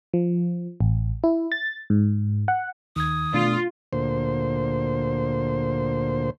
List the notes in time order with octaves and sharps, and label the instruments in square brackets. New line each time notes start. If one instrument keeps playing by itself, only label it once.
[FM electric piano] F3
A1
E4
A6
G#2
F#5
[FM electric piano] D#2 [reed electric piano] D#3 G#6 [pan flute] D#6
[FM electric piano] B2 A3 D4 [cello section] F4
[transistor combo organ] D2 A#2 C5